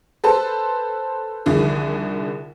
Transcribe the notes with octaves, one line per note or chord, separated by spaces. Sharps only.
A4 B4 C5 A5
C2 D3 D#3 F3 G#4